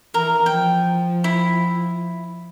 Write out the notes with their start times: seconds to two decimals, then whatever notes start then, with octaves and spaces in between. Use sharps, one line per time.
0.14 E3 A#4
0.46 F3 G5
1.24 E4